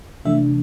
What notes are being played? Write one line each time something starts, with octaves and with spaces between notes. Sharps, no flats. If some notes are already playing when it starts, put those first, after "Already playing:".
C3 E3 A3 D4 E5